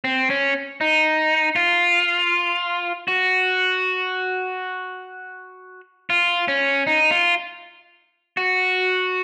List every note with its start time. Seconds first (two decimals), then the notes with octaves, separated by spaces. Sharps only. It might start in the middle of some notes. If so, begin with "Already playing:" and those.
0.04 C4
0.30 C#4
0.81 D#4
1.56 F4
3.08 F#4
6.10 F4
6.48 C#4
6.87 D#4
7.11 F4
8.37 F#4